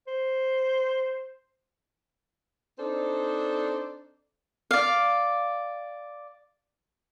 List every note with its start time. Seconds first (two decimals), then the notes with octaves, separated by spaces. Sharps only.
0.08 C5
2.79 C4 D4 D#4 A4 C5 D5
4.71 D5 F5